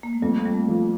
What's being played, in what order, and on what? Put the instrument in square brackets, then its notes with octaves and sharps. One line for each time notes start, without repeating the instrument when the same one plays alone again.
[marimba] A#3
A3
[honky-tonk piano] F2 [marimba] G3
[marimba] G3
A3
[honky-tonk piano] F3